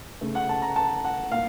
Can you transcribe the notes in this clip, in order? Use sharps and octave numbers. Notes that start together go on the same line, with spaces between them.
C#3 A3
F#5
A5
A#5
A5
F#5
A#2 F5